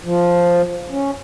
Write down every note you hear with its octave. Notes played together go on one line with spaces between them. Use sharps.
F3
C#4